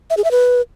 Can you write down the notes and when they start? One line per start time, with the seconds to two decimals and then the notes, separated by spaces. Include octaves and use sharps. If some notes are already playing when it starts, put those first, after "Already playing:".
0.10 E5
0.17 G#4
0.24 E5
0.31 B4